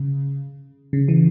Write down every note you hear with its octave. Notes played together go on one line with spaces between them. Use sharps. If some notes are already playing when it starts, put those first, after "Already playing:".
Already playing: C#3
C#3
E3